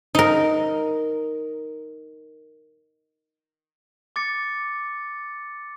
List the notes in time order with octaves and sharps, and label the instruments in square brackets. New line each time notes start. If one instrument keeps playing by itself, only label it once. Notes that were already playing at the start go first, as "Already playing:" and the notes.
[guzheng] D#4 A#4
[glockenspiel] D6 A6 C#7